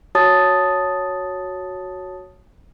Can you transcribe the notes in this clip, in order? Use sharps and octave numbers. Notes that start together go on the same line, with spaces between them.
F#4 C#5 A5 D#6 A6